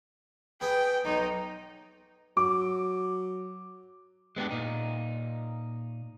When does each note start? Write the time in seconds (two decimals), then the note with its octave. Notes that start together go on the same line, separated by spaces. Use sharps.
0.61 B3 G#4 G5
1.05 B1 D#4
2.37 F#3 D6
4.36 G#3 B3 D4 G4
4.51 A#2 D#4